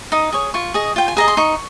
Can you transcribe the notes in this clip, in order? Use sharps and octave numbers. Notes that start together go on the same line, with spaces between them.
D#4 D#6
G#4 C#5
F4 C#6
G#4 D#5
F4 G5
G#5
G#4 D#5 A#5
C6
D#4 C#6